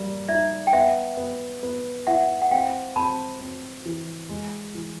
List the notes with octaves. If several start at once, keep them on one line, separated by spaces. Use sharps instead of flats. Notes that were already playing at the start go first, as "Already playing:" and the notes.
Already playing: G3 A#3
D#4 D5 E5
G5
B3 E5 F#5
B3
B3
E4 E5 F#5
F#5
C4 F5 G5
C4 A5 B5
C4
E3
G#3
E3